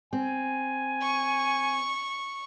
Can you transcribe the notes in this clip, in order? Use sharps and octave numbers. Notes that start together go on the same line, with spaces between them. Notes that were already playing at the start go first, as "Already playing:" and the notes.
C4 G#5
C#6